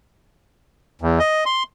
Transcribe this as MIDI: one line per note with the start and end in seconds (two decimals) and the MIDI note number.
1.02 1.19 40
1.19 1.44 75
1.46 1.63 84